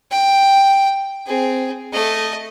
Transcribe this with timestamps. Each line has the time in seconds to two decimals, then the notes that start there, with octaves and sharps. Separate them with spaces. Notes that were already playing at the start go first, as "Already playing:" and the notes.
0.11 G5
1.27 C4 G#4
1.93 A3 D#5